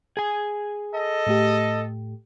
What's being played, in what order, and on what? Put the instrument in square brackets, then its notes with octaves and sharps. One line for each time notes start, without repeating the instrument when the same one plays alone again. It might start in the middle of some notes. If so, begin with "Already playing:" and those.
[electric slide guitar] G#4 G#5
[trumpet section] A4 D#5
[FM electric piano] A2 A3 G4